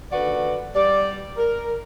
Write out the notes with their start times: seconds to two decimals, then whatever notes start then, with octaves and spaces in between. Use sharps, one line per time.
0.12 D#2 D3 F#4 B4 D5
0.75 G3 D5
1.37 A#4